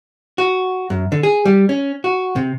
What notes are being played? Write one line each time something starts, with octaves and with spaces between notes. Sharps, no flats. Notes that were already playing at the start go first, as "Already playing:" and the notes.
F#4
F#2
D3
G#4
G3
C#4
F#4
C3